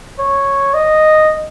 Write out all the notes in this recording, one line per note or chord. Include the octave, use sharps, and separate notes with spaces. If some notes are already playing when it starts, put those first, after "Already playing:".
C#5
D#5